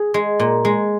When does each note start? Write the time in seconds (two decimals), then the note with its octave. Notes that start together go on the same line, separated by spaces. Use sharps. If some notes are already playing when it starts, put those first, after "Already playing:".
Already playing: G#4
0.14 G#3
0.40 A#2
0.65 G#3